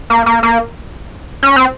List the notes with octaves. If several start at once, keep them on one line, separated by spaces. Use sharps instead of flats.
A#3
A#3
A#3
C#4
C4